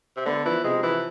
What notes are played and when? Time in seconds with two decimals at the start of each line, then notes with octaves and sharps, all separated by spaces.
0.17 C3
0.25 D3 B3
0.45 E3 F3
0.64 C3 G#3
0.83 E3 F3